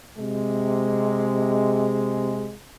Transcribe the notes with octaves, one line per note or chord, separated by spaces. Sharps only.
C3 G#3